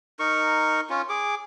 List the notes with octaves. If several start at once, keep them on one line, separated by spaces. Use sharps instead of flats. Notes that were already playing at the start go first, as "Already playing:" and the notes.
D#4 A#4 C#6
C#4 F4
G#4 D6